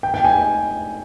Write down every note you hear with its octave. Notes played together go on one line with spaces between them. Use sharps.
G5
G5
G#5